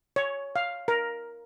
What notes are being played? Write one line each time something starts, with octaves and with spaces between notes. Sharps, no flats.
C#5
F5
A#4